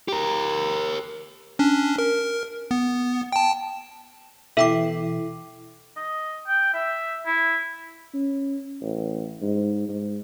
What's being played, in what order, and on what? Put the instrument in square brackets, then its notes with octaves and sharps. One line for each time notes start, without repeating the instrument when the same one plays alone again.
[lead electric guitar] G4 A#4
[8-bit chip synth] C#4 D4
A#4
B3
G5 A5
[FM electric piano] B2 E3 [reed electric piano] E4 [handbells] A4 G5 D6 [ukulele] E5
[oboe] D#5
G5
E5
E4
[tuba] C#4
A1
G#2
G#2